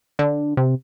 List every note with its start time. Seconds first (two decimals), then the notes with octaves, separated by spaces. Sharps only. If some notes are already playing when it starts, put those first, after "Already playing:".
0.19 D3
0.57 C3